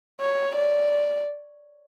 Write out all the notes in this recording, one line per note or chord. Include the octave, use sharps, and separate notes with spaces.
C#5
D5